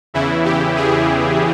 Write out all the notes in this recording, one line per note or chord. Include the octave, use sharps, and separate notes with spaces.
E2 C#3 E3 E4
G4
G#4